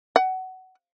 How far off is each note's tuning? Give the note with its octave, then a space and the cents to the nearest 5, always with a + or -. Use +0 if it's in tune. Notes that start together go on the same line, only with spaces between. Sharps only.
F#5 +20